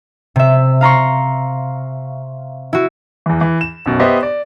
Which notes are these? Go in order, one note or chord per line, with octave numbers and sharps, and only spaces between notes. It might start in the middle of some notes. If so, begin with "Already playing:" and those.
C3 E5
F5 A#5 C6 C#6
E4 F#4
E2 E3
E3
E7
B1 F#2 B2
B3 G4 C5 D#5 E5
D5